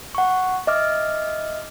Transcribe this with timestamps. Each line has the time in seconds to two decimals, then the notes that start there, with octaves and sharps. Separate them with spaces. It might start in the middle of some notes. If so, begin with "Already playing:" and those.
0.15 F#5 C#6
0.67 D#5 E5 D6 F6